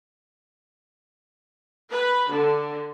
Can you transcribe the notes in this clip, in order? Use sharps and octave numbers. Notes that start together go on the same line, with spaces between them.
B4
D3